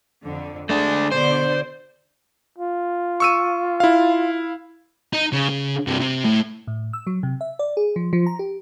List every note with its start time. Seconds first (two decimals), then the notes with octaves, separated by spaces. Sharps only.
0.24 F2 D3
0.69 G#3 A3 D4 G#4
1.12 B2 D3 C5 D5
2.58 F4
3.20 C#6 E6 D#7
3.80 E4 F5
5.13 D#4
5.33 C#3
5.49 C#3
5.87 G2 C3
6.02 C3
6.25 A2
6.67 A2
6.93 E6
7.07 F#3
7.23 C3
7.41 E5
7.59 D5
7.77 G#4
7.96 F3
8.13 F3
8.26 A#5
8.39 G4